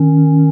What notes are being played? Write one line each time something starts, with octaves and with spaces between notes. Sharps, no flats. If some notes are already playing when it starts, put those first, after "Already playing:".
Already playing: D#3 C#4